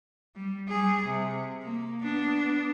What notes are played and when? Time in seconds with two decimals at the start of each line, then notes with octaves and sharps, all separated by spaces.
0.36 G3
0.68 G3 G#4
1.06 C3
1.63 A#3
2.02 B3 D4